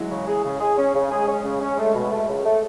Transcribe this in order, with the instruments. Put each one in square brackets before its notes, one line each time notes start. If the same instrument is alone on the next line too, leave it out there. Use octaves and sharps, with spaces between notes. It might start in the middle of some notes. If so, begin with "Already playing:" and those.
Already playing: [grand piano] E3 F#3 G#3
[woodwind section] C#3
G#4
C#3
G#4
C#4
C#3
[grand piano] G#3 [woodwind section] G#4
[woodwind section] C#4
C#3
C#4
[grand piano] G#3 [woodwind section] A3
[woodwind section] B2
A3
C#2
A3